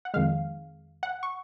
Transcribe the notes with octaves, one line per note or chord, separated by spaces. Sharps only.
F#5
F2 D#3 G#3 F5
F#5
C#6